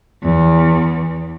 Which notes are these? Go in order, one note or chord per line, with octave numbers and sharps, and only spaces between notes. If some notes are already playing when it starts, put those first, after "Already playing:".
E2